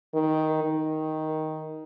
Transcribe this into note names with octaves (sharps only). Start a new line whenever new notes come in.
D#3
D#3